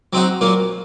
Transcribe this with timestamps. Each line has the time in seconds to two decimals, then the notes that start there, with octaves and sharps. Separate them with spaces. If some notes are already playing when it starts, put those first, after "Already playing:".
0.13 F#3 C4 D#4 F#4
0.41 A#2 F#3 A#3